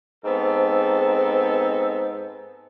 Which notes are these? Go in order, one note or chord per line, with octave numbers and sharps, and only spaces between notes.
G#2 B3 C4 A4